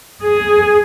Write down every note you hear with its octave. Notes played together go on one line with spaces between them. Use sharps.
G#4